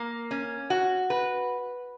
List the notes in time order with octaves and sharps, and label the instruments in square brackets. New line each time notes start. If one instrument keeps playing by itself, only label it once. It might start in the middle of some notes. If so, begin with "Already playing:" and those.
Already playing: [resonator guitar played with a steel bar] A#3
C#4
F#4
B4